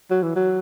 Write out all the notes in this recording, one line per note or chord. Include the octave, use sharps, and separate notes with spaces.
F#3
E3
F#3